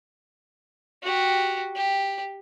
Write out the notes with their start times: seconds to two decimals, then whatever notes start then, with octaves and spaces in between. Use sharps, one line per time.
1.03 F#4 G4
1.75 G4